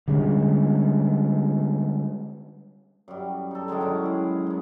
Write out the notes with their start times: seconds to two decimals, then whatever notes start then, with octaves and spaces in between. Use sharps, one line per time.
0.08 D3 G3 G#3 C#4
3.08 F#2 G3
3.51 D#4 A4
3.68 F#2 D3 D#3 G#3
3.80 D#3 C#4 E4
4.05 G#4
4.47 F#3 B3